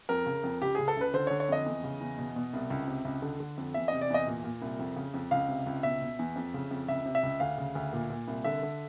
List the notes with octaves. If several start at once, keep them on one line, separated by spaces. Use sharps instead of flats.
F2 A#4
C#3
F2
C#2 G4
C#3 G#4
A4
C#2 B4
D3 C5
D3 C#5
C#5
F2 D#5
E2
C#3
E2
B2
B2
C2
C#2
C3
C#2
D3
D3
F2
E2 E5
C3 D#5
D5
E2 D#5
A#2
A#2
C2
F2
C#3
F2
C#2 F5
C3
C#2
B2 E5
B2
E2
F2
C#3
F2
C#2 E5
C3
E5
C#2
D2 F5
C#3
D2
A#2
A#2
C2
D3 E5
D3